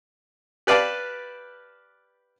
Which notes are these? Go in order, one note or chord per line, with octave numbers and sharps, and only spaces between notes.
G4 B4 D5 F5 A5